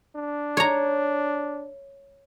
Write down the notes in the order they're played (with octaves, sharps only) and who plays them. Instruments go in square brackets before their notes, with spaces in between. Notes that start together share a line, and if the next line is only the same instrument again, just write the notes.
[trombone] D4
[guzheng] C#5 A#5